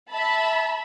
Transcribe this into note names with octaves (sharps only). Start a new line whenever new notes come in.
E5 A5 B5